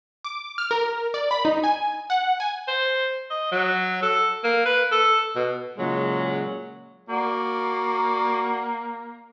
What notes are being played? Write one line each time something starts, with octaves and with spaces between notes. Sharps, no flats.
D6
F6
A#4
D5
B5
D#4
G#5
F#5
G#5
C5
D#5
F#3
A4
A#3
B4
A4
B2
A#2 C#3 F#3 G#3
A#3 F#4 D5